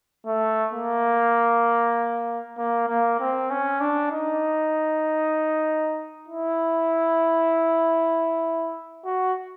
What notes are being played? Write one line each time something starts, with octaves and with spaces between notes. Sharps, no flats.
A3
A#3
A#3
A#3
C4
C#4
D4
D#4
E4
F#4